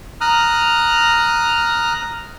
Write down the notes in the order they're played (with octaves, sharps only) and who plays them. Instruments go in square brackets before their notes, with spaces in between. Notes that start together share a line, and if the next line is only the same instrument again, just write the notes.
[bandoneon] A#5 D#6 F6 F#6